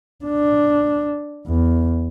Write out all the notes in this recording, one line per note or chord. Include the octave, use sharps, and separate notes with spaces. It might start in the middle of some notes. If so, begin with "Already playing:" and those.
D4
E2